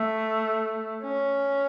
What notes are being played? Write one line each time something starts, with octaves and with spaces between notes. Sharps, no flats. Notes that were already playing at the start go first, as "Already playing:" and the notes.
Already playing: A3
C#4